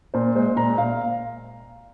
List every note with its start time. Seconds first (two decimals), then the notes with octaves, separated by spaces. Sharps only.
0.14 A#2 C5
0.35 G#3 C5
0.57 A#2 A#5
0.78 A#2 F5